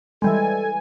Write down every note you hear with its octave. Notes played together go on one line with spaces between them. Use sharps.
E3 G3 G#3 A4 G#5